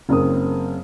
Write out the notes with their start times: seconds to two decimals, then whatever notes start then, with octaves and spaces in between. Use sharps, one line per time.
0.09 F#1 C#3 C4 A#4 D#6